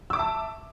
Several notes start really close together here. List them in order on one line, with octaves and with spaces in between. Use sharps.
E6 D6 E5 A5